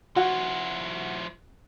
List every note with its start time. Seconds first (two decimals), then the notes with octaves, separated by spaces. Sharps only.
0.16 F3 E4 F#4